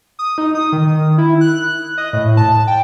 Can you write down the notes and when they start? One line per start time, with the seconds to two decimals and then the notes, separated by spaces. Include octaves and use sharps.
0.19 D#6
0.38 D#4
0.55 D#6
0.72 D#3
1.18 E4
1.41 F#6
1.98 D#5
2.13 A2
2.37 A5
2.67 G5